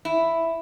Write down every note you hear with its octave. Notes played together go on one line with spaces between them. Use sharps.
E4